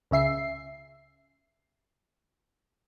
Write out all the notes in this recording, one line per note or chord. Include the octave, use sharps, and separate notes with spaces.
C#2 C#3 E5 C7